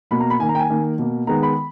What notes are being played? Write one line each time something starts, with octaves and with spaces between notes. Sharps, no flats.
B2 A#3 B5
A#5
B5
D#3 A#3 G#5
A#5
G5
G#5
D#3 A#3
B2 A#3
D#3 G#3 B3 A#5
B5